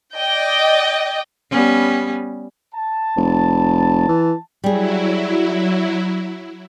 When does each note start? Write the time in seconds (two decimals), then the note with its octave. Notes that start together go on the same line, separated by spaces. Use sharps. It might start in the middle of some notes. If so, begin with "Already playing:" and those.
0.15 D5 D#5 G5
1.51 G3 B3 C#4
2.74 A5
3.17 F1
4.08 E3
4.64 F#3 G3 E4 G#4